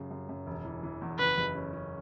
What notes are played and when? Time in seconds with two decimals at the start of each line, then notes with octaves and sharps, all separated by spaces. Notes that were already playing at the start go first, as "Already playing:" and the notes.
Already playing: F#2 C#3
0.11 F#2
0.29 F#2
0.47 E1
0.65 E3
0.83 E3
1.02 E2
1.19 F#1 B4
1.38 F#1
1.55 C#4
1.73 C#4